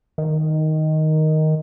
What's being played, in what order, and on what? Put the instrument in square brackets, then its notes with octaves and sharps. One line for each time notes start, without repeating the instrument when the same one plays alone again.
[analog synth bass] D#3